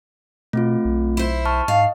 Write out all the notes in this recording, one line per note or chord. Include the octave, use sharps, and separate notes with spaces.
B2 A3 C4 F4
B1
E4 C5
A5 C#6 F6
G#2 D#5 F5